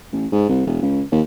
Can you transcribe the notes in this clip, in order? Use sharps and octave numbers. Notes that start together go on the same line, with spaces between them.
A1
G#2
C2
E1
C#2
D#2